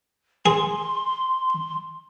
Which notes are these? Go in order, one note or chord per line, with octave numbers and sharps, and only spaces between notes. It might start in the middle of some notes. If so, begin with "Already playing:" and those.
G#4 C6